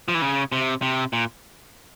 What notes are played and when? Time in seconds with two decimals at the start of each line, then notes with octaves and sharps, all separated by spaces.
0.08 F3
0.14 E3
0.22 C#3
0.52 C3
0.82 C3
1.13 A#2